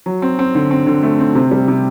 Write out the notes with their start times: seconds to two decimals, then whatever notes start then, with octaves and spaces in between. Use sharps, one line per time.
0.06 F#3
0.22 C4
0.39 C4
0.55 D3
0.71 C4
0.87 D3
1.03 A3
1.19 C4
1.35 C3
1.51 G3
1.68 C3